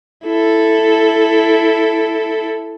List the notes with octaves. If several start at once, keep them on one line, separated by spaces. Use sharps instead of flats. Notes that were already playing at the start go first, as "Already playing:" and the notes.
E4 A4